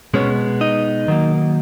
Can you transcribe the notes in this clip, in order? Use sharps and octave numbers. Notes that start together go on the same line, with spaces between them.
B2 G#3 B3 C#4 C#5
D#4 D#5
D#3 F#3 A#3